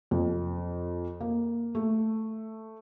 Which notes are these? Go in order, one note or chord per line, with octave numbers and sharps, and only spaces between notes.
F2
A#3
A3